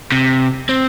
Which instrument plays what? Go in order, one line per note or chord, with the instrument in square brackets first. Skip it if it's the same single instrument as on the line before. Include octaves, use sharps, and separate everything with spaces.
[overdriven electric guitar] C3
C4